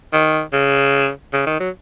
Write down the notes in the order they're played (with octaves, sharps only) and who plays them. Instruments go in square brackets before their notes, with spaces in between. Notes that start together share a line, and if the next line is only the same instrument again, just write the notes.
[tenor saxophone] D#3
C#3
C#3
D#3
F#3